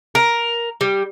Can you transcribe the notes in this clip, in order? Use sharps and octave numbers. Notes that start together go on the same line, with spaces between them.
A#4
G3